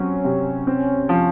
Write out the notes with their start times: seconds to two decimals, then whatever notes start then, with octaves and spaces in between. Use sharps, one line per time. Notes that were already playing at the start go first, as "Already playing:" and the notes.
Already playing: F#3 C4 C#4
0.24 C3
0.67 C4
1.09 F3